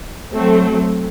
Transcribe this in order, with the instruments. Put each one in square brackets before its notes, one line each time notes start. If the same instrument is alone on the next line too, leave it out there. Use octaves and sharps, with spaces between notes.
[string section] F#3 A3 C4